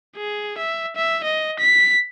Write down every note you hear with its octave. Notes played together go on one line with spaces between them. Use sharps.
G#4
E5
E5
D#5
B6